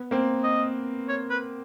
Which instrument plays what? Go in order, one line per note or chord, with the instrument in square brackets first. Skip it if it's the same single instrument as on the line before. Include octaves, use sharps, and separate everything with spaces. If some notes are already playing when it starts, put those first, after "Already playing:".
Already playing: [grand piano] B3
A#3 C4
[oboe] D#5
C#5
B4